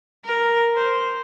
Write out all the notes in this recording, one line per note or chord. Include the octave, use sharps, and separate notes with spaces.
A#4
C5